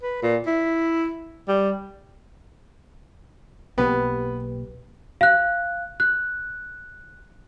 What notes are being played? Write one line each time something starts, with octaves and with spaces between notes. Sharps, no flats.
B4
A#2
E4
G3
B1 B2 A#3 B3 G4 B4
F5 F#6
F#6